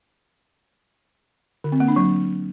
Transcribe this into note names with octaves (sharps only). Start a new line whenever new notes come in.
D3
C4
A#3
D4
F#3